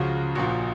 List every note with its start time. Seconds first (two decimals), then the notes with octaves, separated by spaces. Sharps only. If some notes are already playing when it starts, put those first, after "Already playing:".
Already playing: C#2 C#3 F3 F#4
0.35 A#1 A#2 F3 F#4